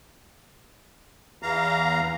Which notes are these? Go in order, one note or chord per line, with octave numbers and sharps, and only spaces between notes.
E2 E3 F5 A#5